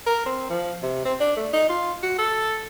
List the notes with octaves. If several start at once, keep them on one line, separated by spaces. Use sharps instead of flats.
A#4
C4
F3
C3
C4
D4
A3
D#4
F4
F#4
A4